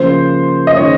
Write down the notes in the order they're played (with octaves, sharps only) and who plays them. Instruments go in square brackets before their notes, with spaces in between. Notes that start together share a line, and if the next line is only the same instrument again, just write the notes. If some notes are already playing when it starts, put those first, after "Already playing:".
Already playing: [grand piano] C#3 F3 A#3 [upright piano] C5
[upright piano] D#5
[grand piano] D#3 G#3 C#4 [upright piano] C#5